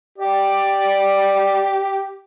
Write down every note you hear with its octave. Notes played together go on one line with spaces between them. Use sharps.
G4 D5